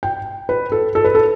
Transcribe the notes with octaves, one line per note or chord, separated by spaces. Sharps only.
G5
B4
A4
A4
B4
A4